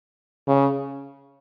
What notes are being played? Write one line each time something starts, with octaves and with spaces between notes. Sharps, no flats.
C#3